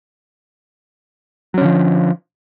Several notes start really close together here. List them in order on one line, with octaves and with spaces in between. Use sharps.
F#3 C#4 D3 F3